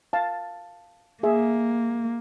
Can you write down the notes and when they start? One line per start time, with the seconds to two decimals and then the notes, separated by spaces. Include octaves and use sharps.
0.13 F5 A5
1.23 A#3 G#4 E5